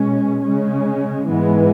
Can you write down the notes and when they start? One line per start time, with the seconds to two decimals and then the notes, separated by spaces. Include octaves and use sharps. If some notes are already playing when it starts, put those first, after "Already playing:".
Already playing: B2 G#3 C#4
0.45 C#3 G#3 C#4
1.28 G#2 E3 G#3 B3